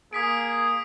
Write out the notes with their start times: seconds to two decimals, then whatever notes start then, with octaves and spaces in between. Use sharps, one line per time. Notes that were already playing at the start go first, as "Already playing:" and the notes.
0.13 A#3 G#4 D#6 B6 D7